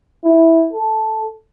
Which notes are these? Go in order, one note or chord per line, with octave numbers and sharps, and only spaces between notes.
E4
A4